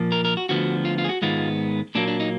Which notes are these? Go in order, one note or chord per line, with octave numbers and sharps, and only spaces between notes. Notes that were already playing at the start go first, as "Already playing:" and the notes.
Already playing: A#2 F3 A#3
A#4
A#4
F#4
D2 D3 F3 B3 F#4
F4
F4
G#4
F#4
G#2 D#3 G#3 B3 F4
A#2 F#3 A#3 D4
D4
D#4